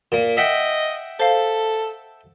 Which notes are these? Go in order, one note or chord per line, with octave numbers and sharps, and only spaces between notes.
A#2 A#3
D#5 E5 F#5 G5
A4 C5 F5